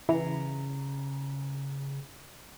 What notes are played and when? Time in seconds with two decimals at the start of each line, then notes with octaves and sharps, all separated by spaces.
0.09 C#3 E3 A#5